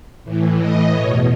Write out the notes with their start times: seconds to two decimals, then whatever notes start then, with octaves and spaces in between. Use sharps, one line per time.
0.24 A2 E3
0.59 A2 E3 D#5
0.93 E2 B2 C#5